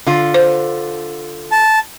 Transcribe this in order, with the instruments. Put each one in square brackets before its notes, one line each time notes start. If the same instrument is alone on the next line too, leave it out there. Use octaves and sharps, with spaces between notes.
[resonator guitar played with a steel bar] D3 F4
[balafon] C5
[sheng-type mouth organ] A5